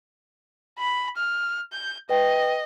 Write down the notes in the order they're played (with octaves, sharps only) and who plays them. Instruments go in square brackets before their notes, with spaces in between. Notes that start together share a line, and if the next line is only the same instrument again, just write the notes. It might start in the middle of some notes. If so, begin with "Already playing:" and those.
[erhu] B5
F6
G6
[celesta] B4 G5 [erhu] D#5